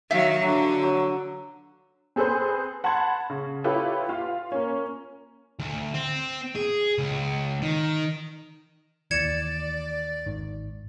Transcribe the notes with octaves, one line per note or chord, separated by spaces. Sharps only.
D#3 F#3 F#4 E5 F5
D3 F#3
F#3
C4 G#4 A4 B4 C5
F#5 A5 B5 C6 G#6
C#3
E4 F4 G4 A4 B4 C#5
F4 F5
A#3 C#4
D2
C4
G#4
C#2
D#3
D#2 E3 D5 G#6 C#7 E7
G#1 D#3